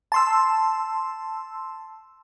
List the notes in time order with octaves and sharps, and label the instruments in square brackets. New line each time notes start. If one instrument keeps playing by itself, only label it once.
[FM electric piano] A5 C6 E6